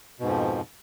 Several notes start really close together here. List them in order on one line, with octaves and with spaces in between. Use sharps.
B2 G#2 F2 F3